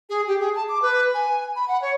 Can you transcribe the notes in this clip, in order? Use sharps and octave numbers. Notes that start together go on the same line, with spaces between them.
G#4
G4
G#4
A5
D6
B4
G#5
B5
F#5
C#5